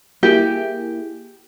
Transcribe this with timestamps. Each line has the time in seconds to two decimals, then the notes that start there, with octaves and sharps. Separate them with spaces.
0.23 A#3 E4 G4 G#4 G5